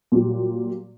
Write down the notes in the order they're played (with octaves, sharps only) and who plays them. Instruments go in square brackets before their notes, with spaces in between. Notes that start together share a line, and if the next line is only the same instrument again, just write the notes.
[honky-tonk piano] A#2 F#3 G3